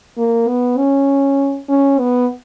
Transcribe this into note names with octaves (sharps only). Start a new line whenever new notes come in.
A#3
B3
C#4
C#4
B3